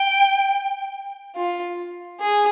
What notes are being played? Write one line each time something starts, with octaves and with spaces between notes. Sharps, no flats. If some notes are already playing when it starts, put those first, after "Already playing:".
Already playing: G5
F4
G#4